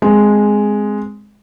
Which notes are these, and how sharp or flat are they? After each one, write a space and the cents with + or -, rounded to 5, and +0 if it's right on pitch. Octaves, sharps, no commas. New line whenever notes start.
G#3 +0 C4 +0